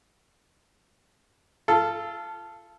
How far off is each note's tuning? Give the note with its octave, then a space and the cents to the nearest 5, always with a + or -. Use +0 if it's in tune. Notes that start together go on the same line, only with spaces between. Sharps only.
F4 -25 A4 +0